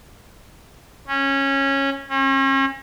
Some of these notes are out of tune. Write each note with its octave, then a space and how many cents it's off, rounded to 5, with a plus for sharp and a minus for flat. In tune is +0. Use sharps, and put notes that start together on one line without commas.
C#4 -15
C#4 -40